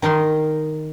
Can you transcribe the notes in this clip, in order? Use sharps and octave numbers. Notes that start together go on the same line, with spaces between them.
D#3 D#4 A#4 C6